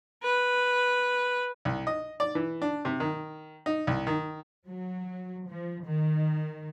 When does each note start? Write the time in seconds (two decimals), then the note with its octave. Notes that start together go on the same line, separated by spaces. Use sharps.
0.23 B4
1.65 C2
1.87 D#5
2.20 D5
2.35 E3
2.62 D4
2.85 C3
3.00 D#3
3.66 D#4
3.87 C2
4.07 D#3
4.68 F#3
5.48 F3
5.85 D#3